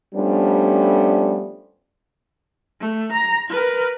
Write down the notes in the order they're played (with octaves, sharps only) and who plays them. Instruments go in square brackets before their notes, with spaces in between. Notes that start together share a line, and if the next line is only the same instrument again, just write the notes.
[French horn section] F3 G3 A3 B3 C#4 D4
[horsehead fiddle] A3
A#5
A#4 B4